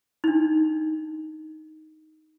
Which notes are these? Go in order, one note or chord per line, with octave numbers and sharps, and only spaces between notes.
D4 D#4